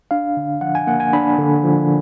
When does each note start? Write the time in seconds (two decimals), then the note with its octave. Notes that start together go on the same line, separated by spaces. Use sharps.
0.11 D4 F5
0.37 D3
0.61 F3 F#5
0.75 G#5
0.87 A#3 F#5
1.00 G#5
1.13 D4 B5
1.39 D3
1.63 F3